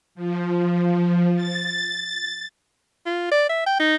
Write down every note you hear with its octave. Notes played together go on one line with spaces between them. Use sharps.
F3
A6
F4
D5
E5
G5
D#4